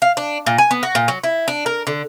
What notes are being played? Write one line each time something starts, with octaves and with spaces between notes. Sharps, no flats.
F5
D4
A#2
G#5
B3
F#4
A#2
F#3
E4
D4
A#4
D3